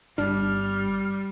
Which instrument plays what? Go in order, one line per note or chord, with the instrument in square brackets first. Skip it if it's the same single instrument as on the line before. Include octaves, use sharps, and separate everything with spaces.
[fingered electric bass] G1 [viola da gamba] G3 [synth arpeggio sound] D4 [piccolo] F6